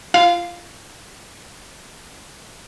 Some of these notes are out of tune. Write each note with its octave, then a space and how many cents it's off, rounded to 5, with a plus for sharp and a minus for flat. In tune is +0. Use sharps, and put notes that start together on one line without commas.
F4 -35 F5 +0